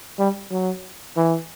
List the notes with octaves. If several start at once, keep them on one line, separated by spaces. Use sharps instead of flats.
G3
F#3
E3